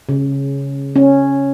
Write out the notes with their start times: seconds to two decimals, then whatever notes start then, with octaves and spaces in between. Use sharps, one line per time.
0.09 C#3
0.96 C#4